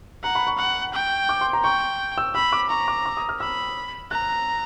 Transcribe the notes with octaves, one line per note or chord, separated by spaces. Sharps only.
F#5 A#5
B5
C#6
F#5
G5
D6
C6
A#5
G5 C#6
E6
B5 E6
D6
A#5 C#6
D6
D6
D#6
F6
B5 E6
A#5 F#6